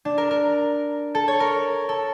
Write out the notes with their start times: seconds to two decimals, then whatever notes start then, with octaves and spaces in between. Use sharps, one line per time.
0.05 D4
0.18 A#4
0.31 A#4
1.15 A4
1.28 C#5
1.40 A#4
1.89 A4